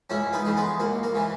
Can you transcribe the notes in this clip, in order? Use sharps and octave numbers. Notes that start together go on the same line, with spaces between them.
C#2 C#4 E4
B3 D#4
C#3 E3
G#3 B3
C#2 A#3
A#3
C#3 E3